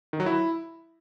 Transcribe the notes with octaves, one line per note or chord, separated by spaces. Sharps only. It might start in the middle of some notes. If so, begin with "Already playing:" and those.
D#3
F#3
E4